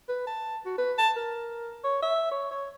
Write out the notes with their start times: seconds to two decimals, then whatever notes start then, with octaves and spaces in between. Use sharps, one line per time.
0.09 B4
0.27 A5
0.66 F#4
0.78 B4
0.98 A5
1.16 A#4
1.84 C#5
2.02 E5
2.32 C#5
2.51 C#5